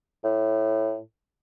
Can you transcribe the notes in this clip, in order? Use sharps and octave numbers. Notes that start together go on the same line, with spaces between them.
A2